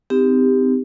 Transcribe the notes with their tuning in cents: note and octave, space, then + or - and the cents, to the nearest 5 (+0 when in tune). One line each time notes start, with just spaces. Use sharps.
C4 -35 D#4 +0 G4 +15